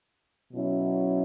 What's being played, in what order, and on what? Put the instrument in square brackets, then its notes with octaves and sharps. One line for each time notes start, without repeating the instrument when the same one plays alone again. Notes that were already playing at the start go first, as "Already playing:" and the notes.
[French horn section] B2 F#3 C#4 E4